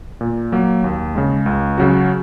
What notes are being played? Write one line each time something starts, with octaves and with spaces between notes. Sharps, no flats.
A#2
F#3 A#3
D#2
C#3 G#3
C#2
C#3 F#3 C#4 F#4